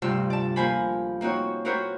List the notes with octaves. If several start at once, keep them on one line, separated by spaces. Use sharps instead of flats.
D2 G2 C3 F4 C6 E6
D5 A5
F3 A#3 A#4 C5 G#5 B5
A#3 C4 D#4 F#4 C#5
C4 E4 F#4 A#4 C5 C#5